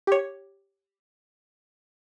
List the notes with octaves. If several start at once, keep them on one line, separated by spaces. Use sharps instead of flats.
G4 C#5